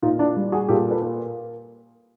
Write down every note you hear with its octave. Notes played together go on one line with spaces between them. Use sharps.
A#2 D#4 F4
D4 E4
G3
F#4 G#4
A#2 G4 A4
A4 B4
A#3